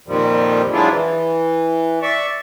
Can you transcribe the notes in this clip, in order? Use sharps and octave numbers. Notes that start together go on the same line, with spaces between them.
F2 A#2 D#3 F3 G3
F3 F#3 G#3 D4 E4 F4
E3
D5 E5 C#6